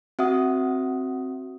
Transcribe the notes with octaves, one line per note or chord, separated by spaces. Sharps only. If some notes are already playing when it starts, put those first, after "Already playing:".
C4 F#4 E5 F#5 D#6